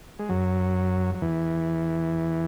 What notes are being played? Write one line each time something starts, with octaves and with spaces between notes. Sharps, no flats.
G#3
F#2 F#3
F#3
E2 E3